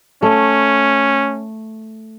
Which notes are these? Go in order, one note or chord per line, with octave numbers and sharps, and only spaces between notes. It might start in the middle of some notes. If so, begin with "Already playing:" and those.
A3 C#4